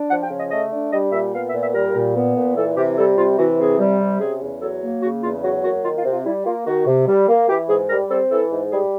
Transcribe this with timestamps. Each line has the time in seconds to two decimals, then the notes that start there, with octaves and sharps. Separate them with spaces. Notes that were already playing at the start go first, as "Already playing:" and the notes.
Already playing: D4
0.10 F3 F#5
0.23 G5
0.31 C#3
0.37 D#5
0.51 A3 D#5
0.72 D4
0.92 G3 D#5
1.12 A#2 E5
1.33 B3 F5
1.47 E5
1.54 A#2
1.61 E5
1.74 G3 A#4
1.94 A#2
2.15 B3
2.36 A#2
2.56 E3 A4
2.77 C3 G4
2.97 G3 A4
3.18 C3 F4
3.38 E3 F#4
3.59 C3 G#4
3.80 G3
4.00 C3
4.20 C#3 G#4
4.41 E2
4.61 F#3 A4
4.82 A#3
5.03 C#3 F#4
5.23 E2 F4
5.44 F#3 F#4
5.64 A#3 F#4
5.84 D#3 F4
5.98 F4
6.05 C3
6.12 F4
6.25 G3 E4
6.46 A#3 F4
6.67 D#3 F#4
6.87 C3
7.08 G3
7.28 A#3
7.49 E3 G4
7.69 G#2 G#4
7.90 G3 A#4
8.11 C4 A4
8.31 E3 A4
8.52 G#2
8.72 G3 G#4